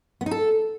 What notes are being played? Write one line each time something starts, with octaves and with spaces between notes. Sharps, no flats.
B3
D#4
A4